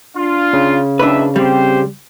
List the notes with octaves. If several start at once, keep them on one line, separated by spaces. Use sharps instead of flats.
D4 F4
C#3
F#1 D#2 D4 B4 E5
G3 C4 G4 C5